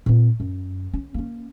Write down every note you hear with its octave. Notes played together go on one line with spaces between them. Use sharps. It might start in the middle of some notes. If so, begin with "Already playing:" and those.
A#2 C4
F#2
C#4
A#3 C#4